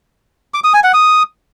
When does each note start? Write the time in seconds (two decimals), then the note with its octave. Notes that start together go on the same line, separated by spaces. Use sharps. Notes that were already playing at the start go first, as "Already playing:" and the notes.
0.54 D6
0.64 D#6
0.74 G#5
0.84 F#5
0.94 D#6